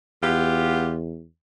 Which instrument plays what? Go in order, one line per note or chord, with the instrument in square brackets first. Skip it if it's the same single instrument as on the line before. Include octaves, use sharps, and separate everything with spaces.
[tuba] E2 [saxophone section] B3 F4 G4